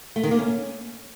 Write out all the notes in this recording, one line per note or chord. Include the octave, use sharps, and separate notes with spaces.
A3
D#3
A#3
C#4